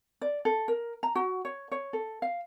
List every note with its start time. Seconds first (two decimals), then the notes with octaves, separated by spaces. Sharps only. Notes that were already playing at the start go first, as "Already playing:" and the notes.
0.22 D5
0.45 A4
0.68 A#4
1.03 A#5
1.15 F#4
1.45 C#5
1.72 C#5
1.93 A4
2.22 F5